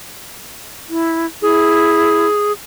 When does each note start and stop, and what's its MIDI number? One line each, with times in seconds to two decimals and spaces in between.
0.89 1.26 64
1.42 2.28 64
1.42 2.52 68